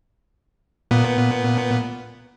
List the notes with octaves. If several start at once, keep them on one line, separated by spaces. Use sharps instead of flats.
A#2 B3